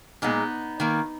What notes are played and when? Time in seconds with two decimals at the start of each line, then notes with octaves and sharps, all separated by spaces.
0.22 A#2 G#3 B3 D#4
0.80 D#3 A#3